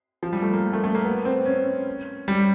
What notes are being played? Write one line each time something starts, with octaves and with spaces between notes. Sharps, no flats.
F3
G3
A3
A#3
A3
A3
A#3
B3
C4
C#4
G3